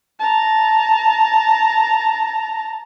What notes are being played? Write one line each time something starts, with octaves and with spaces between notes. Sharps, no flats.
A5 A#5